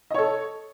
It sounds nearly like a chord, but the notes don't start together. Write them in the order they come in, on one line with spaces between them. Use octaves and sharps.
D#5 C#5 A4